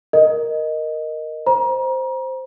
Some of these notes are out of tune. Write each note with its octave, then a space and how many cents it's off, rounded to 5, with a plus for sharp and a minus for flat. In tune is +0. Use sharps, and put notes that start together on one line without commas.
A#4 +0 D#5 +0
C5 +0 A#5 +35